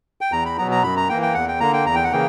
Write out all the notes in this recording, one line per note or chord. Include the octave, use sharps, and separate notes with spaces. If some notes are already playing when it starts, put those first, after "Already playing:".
G5
E2 A#5
B5
B2 F#3 B3 A#5
A#5
F#2 B5
A#5
E3 A#3 G5
G5
E2 F#5
G5
D3 A#3 A#5
G5
E2 A#5
G5
F#5
C#3 E3 A#3 G5